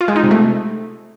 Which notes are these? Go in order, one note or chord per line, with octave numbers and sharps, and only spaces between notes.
F4
G#3
D#4
C3
A3